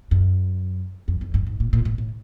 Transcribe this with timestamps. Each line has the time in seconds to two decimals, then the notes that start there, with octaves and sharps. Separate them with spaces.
0.11 F#2
1.08 F2
1.21 F2
1.34 G2
1.47 G#2
1.60 A#2
1.73 A#2
1.85 A2
1.98 A2